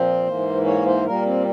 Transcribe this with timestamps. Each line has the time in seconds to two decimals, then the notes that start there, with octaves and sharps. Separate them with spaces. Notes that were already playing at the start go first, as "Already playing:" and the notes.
Already playing: A#2 F3 C4 C5
0.27 G#2 E3 A#3
0.66 C#5
0.86 C5
1.06 A#2 G3 A#3 A#4
1.25 C4